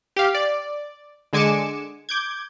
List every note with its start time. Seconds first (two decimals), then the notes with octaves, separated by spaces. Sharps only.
0.16 G4 F5
0.35 D5
1.33 D3 G#3 G#5 D6 C#7 E7
2.09 D6 G6 G#6